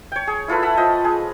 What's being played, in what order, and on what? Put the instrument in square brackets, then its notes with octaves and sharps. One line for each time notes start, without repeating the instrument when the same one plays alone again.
[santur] C#5 G5
G#4
E4 F4 A4 B4
E5 F#5 A5 B5
F3 F4 D#5 G5
G#3 G#4